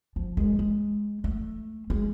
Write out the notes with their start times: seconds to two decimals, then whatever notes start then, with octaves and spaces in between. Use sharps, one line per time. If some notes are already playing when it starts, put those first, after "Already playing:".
0.16 F3
0.37 G#3
0.59 G#3
1.24 A3
1.90 G#3